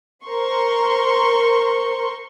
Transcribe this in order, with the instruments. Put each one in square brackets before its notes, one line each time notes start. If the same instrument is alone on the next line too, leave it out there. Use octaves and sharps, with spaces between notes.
[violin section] A#4 C5 C6 C#6